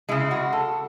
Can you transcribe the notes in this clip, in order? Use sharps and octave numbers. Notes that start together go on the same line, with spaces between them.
C#3 G#3 E4
F#4
A4